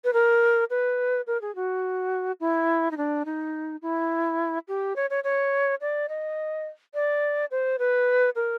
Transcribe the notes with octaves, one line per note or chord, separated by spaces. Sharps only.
B4
A#4
B4
A#4
G#4
F#4
E4
D#4
D4
D#4
E4
G4
C#5
C#5
C#5
D5
D#5
D5
C5
B4
A#4